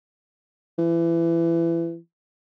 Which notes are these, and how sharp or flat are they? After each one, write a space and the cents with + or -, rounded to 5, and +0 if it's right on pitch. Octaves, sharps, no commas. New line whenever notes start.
E3 +25